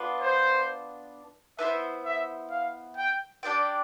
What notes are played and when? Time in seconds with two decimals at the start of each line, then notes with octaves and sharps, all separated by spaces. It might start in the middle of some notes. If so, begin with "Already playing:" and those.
Already playing: B3 D4 F4 B4
0.21 C5
1.59 B3 E4 A4 C5 E5
2.05 E5
2.51 F5
2.97 G5
3.43 D4 G4 D5 G5